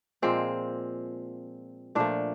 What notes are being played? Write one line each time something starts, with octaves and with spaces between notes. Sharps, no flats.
A#2 F3 G#3 C4
A#2 F3 A3 D4